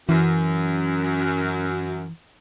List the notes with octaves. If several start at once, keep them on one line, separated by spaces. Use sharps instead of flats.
F#2 E3